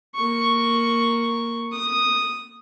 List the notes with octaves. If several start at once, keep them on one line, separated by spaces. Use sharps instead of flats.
A#3 C#6
D#6